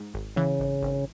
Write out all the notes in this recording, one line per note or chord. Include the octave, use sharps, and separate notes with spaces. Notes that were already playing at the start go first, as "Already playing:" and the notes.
Already playing: G#2
G#1
C#3 E3
G#1
G#1